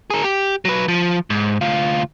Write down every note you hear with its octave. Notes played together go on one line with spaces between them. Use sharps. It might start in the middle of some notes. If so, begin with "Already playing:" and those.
G#4 A#4
G4
F#3 B4
F3
G#2
D2 F4